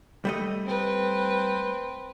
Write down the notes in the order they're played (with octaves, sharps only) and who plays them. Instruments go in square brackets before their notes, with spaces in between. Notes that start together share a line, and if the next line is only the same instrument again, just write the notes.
[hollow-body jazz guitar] G3 A3 D#5
[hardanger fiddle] C4 B4